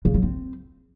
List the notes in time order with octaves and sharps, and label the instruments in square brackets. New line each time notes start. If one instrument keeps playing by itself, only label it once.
[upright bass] C#3
F#3
C4